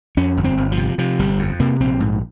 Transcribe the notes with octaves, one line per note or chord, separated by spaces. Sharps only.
F2 C#4
G1
C4
G1
F3
C3
C3 F3
G1 G3
F2
C3 A#3
A#1 C4
G#2